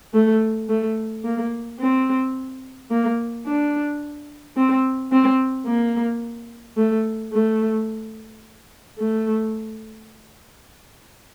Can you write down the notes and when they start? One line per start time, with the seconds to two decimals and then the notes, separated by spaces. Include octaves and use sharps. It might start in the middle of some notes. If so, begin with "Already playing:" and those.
0.14 A3
0.69 A3
1.24 A#3
1.79 C4
2.90 A#3
3.46 D4
4.56 C4
5.12 C4
5.66 A#3
6.77 A3
7.32 A3
8.98 A3